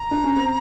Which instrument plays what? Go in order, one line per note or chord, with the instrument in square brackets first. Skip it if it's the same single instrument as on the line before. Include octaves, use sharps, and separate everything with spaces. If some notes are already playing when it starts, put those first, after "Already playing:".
Already playing: [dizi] A#5
[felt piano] D4
C#4
C4